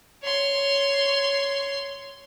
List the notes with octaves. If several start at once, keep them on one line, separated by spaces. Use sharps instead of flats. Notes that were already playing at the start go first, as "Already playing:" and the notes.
C#5 C6